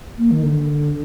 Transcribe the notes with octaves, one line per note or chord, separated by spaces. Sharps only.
A#3
D#3
D3